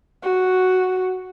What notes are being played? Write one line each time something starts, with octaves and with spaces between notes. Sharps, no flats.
F#4